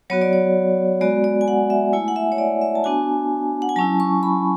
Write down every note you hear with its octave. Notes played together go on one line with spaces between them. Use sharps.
F#3 B3 F#4 C#5
D5
C#5
G#3 B3 F#4 D5
D5
G#5
F#5
E5
A3 E4 G#5
F#5
E5
C#5
D5
E5
A5
B3 D4 F#4 G#5
F#5
G#5
F#3 C#4 E4 A5
C#6
B5